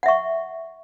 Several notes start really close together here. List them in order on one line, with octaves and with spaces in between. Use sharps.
F#5 E5 C#6